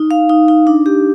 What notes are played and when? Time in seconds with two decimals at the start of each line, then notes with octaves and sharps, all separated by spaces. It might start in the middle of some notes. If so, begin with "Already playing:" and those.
Already playing: D#4
0.11 F5
0.29 D#4
0.48 D#4
0.67 D4
0.86 G4